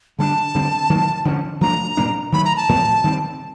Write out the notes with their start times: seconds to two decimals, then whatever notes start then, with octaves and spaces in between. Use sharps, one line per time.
0.19 D3 G3 A#3 D4 A5
0.55 D3 G3 C4
0.90 D#3 F#3 A#3
1.25 D3 F3 A3 C#4
1.61 F3 A3 D4 A#5
1.97 A#2 G3 A#3 D4
2.32 D#3 F#3 A3 B5
2.45 A#5
2.57 A5
2.69 A2 F3 A3 C4
3.04 D#3 G3 C4